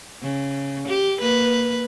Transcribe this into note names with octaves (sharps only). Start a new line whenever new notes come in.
C#3
G4
A#3 B4